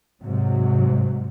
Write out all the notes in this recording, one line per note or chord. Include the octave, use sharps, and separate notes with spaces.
G#2 C3 F#3